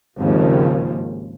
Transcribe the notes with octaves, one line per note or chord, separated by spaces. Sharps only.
G#1 D#2 C#3 F3